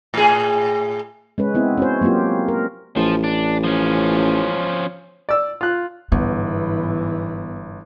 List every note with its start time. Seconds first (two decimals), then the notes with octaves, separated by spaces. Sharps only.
0.14 A2 G#4
1.38 G#3 C#4 B4
1.54 B3 C4 E4
1.77 C#4 F#4 C5
2.01 F#3 A#3 C4 F4 G4
2.48 A#4
2.97 A1 F3
3.24 D4
3.64 F3 C#4
5.29 D5 E6
5.61 F4 F#6
6.12 G1 G#2 E3 B3